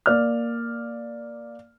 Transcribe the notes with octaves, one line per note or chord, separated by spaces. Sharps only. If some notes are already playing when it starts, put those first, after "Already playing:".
A#3 D5 F6